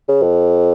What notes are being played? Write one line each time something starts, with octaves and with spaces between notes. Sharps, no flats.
C#3
F2